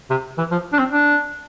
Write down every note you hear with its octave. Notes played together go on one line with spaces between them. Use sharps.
C3
E3
F3
D4
C4
D4